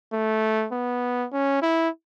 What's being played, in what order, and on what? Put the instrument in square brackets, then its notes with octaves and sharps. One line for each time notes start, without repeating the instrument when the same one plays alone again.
[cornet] A3
B3
C#4
E4